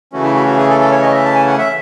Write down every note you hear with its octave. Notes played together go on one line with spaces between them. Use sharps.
C#3 E3 A3 C#4 F#4
E4
F#4
F#4
G#4
A4
A4
C#5
D#5
E5
A5
G#5
F#5
E5